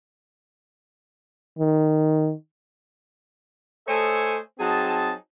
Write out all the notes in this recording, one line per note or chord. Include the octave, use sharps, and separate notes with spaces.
D#3
A3 A4 C5 C#5 D#5 G#5
F#3 C4 D#4 G#4 A5